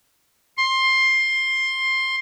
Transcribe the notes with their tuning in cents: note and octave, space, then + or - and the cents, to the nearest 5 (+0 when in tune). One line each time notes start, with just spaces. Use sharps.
C6 +15